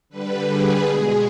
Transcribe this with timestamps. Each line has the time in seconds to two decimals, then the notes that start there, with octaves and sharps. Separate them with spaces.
0.09 D3 G3 B4
0.47 G#4
0.85 B2 G#3